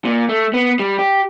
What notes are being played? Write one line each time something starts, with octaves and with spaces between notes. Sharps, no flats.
A#2
A3
B3
G3
G4